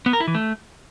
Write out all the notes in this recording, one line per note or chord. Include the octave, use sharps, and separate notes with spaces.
B3
A#4
E4
E3
A3